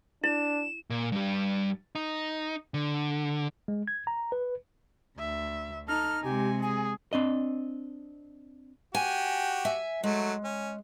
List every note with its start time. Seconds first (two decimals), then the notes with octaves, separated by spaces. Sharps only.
0.24 D4 E4 E7
0.90 A#2
1.12 G2 G3
1.95 D#4
2.74 D3
3.68 G#3
3.88 G#6
4.07 A#5
4.32 B4
5.19 D2 E5
5.88 D#4 A4 F6
6.24 C3 G#3 G4 G#5
6.62 G#4 G#5
7.13 C4 D4 D#5
8.95 F#4 G4 G#5
9.65 E5 G#5
10.04 F#3 G#3 A3
10.44 C#4